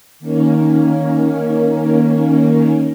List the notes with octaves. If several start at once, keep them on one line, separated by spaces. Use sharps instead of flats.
D#3 A#3 C#4